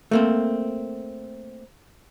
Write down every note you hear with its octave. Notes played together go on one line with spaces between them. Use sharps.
A3 A#3 C4